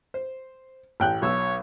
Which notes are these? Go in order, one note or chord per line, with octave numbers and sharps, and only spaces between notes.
C5
A1 G5 F#6
B1 C#5 E6